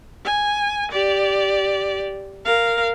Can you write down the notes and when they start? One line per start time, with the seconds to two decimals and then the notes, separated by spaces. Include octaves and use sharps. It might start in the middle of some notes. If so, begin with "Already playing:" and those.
0.25 G#5
0.92 G4 D5
2.45 A#4 F5